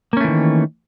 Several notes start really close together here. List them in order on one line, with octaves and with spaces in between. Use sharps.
A#3 C#4 A3 E3 D#3